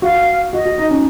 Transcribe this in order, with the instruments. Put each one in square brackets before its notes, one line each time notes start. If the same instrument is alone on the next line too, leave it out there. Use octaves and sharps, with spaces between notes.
[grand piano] F#4 [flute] F5
[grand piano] F#4 [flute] D#5
[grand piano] F#4
D#4
C#4